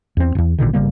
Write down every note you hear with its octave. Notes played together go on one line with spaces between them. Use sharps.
E2 C4
E1 E2
G#1 A#2 D3 D#3
G1 C#3 G3 A#3